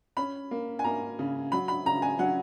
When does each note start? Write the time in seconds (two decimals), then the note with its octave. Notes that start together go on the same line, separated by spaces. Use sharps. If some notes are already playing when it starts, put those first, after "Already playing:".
0.17 C#4 B5
0.51 A#3
0.79 G#5
0.84 A#3 A#5
1.19 C#3
1.52 F#3 B5
1.68 B5
1.86 C#3 A#5
2.02 G#5
2.19 F#3 F#5